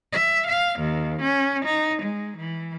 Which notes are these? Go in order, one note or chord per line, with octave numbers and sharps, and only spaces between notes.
E5
F5
D#2
C#4
D#4
G#3
E3